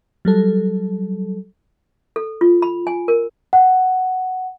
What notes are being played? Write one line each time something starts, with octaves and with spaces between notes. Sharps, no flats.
F#3 G3 A4
A4
F4
B5
G#5
A#4
F#5